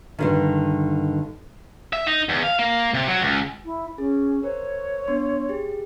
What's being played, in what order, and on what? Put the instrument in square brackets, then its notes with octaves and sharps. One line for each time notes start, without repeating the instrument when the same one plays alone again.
[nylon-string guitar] G2 D3 D#3
[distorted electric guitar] E5
D#4
E2
F5
A#3
C3
F#3
C#2
[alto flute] E4
[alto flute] C#4 [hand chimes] G#4
[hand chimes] A#4 C5 [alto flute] C#5
[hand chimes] B3 D4 C6
G4 G#4